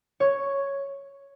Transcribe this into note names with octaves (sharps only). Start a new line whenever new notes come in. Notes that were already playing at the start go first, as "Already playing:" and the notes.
C#5